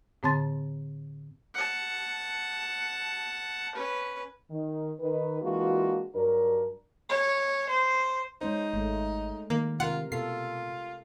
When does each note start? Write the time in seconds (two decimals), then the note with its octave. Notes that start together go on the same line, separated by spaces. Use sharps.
0.23 A2 D3 C4 A5 C6 A6
1.54 F#5 A5
3.75 C#4 B4
4.51 D#3
5.00 D#3 B4
5.41 E3 G#3 A#3 D4 F4 F#4
6.14 G2 F#3 D4 A#4
7.10 C#5
7.69 C5
8.41 G#3 C#4 D#4 C5
8.74 G#1 G#3 A3
9.50 D#3 A#3
9.80 C3 F4 A#4 F#5
10.12 B2 F4 A4 C7